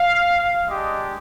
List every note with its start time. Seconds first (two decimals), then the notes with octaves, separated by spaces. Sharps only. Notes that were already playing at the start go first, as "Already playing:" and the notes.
Already playing: F5
0.65 G#3 D4 G4 D#5